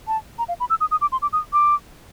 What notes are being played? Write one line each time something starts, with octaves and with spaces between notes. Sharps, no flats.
A5
A#5
F5
B5
E6
D#6
D#6
D6
C6
D6
D#6
D6